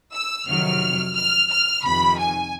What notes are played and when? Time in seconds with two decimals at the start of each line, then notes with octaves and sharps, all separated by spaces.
0.13 E6
0.47 F2 C3 D#3 F#3 F6
1.15 F6
1.50 F6
1.83 F2 C3 D#3 B5
2.18 G#5